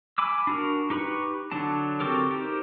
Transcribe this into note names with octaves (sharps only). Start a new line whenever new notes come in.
G#5 B5 D6 E6
D4 F#4 A#4
D#4 G4 B4 B5 C#6
D3 F#3 D4 A5
C4 F#4 G4 A4 A#4
D#4 G4 A#4 C5